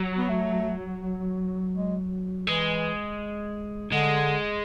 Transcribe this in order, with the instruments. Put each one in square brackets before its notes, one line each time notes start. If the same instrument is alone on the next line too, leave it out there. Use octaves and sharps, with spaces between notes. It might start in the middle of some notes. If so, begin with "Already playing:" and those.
Already playing: [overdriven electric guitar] F#3
[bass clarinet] B3
A3
G#3
[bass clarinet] E3 [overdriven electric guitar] G#3
[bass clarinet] D3 [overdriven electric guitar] G#3